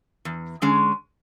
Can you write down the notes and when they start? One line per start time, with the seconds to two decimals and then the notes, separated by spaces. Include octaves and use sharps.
0.25 E2
0.62 D3 G#3 C#4